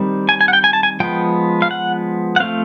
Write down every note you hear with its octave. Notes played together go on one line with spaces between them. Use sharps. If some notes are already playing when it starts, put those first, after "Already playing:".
Already playing: D#3 G3 C4
G#5
G#5
F#5
G5
G#5
A5
G#5
F3 G#3 B3 G5
F5
F#5
F#5
F3 A3 C4 F5